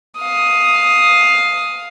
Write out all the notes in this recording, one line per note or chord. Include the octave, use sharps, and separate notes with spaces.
F5 D#6